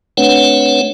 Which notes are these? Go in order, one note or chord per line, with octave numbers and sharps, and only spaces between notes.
A3 C4 D4 B4 C#5 F#5